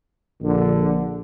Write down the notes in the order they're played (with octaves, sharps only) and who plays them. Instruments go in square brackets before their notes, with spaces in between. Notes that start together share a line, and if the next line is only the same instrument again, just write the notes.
[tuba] A#1 [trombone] D3